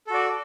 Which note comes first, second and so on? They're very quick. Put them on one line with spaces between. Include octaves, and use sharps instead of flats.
A4 F#4 D5